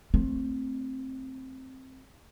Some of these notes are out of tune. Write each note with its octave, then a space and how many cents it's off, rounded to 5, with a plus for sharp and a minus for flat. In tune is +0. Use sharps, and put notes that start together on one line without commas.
A3 +15 C4 +10